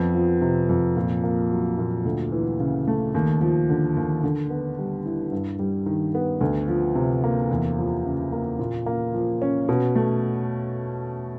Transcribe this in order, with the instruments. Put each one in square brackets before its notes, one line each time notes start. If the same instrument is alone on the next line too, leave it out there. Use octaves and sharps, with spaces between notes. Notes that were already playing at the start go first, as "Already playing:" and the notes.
Already playing: [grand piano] F2 B3
F3
C3
F2
A#2
A#3
F#3
A#2
D2
E3
C#3
A3
D#2
F3
D3
D#2
D3
B3
G3
E4
G2
G3
D#3
B3
D2
F3
C3
A#3
E2
F3
C#3
A#3
A#2
A#3
F3
C#4
B2
A3